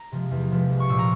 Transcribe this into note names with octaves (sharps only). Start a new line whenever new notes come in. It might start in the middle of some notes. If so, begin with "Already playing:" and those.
Already playing: A#5
C3 F3 G#3
E2
C3 F3 G#3
C2
C#6
A#2 G3 E6
A#5